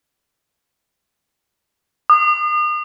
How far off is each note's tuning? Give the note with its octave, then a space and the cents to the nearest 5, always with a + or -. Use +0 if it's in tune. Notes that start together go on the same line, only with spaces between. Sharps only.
D#6 -40